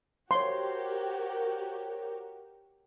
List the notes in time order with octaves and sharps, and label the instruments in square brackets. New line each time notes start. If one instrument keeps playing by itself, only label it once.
[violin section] F#4 G4 A#4 [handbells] C5 C#5 [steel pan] C6